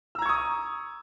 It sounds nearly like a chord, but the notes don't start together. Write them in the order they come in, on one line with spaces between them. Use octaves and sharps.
E6 A#5 G#6 C#6 D#6